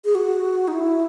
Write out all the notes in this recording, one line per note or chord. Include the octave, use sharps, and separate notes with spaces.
G#4
F#4
D#4
E4